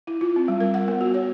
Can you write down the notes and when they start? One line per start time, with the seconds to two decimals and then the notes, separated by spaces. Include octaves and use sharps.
0.07 E4
0.21 F4
0.36 C4
0.48 G3
0.60 A#4
0.74 F#5
0.88 B3
1.01 F#4
1.14 C#5